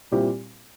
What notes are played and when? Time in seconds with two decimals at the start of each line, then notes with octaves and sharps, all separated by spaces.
0.11 A#2 G3 C4 E4 G4